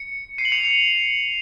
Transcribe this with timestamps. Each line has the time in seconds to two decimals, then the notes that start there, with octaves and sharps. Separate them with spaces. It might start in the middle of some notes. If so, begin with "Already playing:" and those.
Already playing: C#7
0.38 C7 D#7
0.45 F#7
0.52 C#7 F7
0.63 C#7 F7